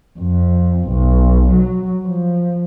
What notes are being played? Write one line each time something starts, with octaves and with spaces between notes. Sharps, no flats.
F2
B1
F#3
F3